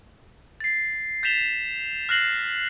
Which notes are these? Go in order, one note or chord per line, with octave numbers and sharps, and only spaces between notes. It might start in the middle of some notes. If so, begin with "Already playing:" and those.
A6 C7
G6 A6 B6 E7 F7 G7
F6 F#6 A#6 C7 F#7